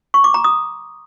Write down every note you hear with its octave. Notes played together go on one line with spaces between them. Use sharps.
C#6
D6
A#5
D#6